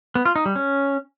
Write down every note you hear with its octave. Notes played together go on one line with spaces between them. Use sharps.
B3
F4
D#4
G3
C#4